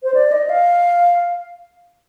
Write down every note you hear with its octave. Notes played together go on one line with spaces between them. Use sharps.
C5
D5
D#5
F5